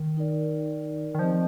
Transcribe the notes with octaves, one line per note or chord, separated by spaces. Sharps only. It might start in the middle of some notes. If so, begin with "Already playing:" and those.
Already playing: D#3
D#4 A#4 D5
D#3
F3 C4 G4 C5 D#5